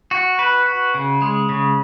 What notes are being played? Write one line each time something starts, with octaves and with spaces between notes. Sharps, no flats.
F#4
B4
F#4
C#3
G#3
C#3